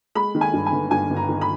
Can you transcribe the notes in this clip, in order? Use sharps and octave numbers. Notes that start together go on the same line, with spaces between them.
G#3 B5
D#3
G#5
G2
G#5
G1
G2 G#5
G1
A#5
D#3
B5